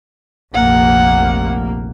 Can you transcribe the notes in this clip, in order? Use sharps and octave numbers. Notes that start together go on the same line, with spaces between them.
F1 A#1 A#3 F#5